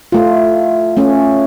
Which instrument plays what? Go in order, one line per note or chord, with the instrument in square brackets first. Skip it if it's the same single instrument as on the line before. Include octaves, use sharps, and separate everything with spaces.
[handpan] A3 F4
A3 C#4